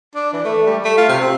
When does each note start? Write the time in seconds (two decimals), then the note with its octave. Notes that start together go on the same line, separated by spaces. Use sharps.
0.15 D4
0.33 E3
0.45 A3
0.66 G3
0.85 A3
0.97 F4
1.09 C3
1.21 C4